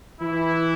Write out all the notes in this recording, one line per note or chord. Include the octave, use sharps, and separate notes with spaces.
E3 E4